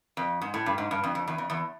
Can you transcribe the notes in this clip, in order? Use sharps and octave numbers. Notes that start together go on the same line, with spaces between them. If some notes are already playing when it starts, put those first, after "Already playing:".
F2
G#2
A2
G2
G#2
G2
F2
F2
E2
F2
E2